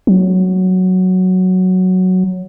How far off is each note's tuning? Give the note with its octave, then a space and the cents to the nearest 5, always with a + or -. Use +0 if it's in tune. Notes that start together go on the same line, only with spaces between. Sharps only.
F#3 +0